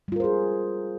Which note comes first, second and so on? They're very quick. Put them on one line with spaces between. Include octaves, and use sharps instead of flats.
G3 F4 A#4 C5 G#4